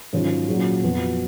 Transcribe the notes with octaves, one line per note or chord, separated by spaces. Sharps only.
G#2 D#3 F#3 C#4 F4
A#2 F#3 C#4 F4 G#4
F2 F3 B3 F#4 B4